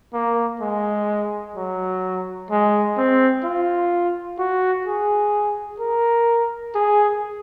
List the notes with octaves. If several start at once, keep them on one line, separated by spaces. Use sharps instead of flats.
A#3
G#3
F#3
G#3
C4
F4
F#4
G#4
A#4
G#4